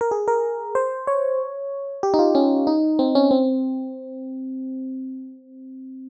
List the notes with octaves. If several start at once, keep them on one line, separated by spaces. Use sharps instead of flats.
A#4
G#4
A#4
C5
C#5
G4
D#4
F4
C#4
D#4
C4
C#4
C4